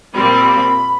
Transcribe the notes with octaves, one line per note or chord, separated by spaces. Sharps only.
A#2 G3 C4 B5